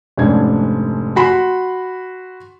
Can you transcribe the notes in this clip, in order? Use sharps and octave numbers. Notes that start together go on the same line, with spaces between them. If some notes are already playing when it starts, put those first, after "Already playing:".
F1 G#2 C#4 D4 G#6
F#4 B5 C6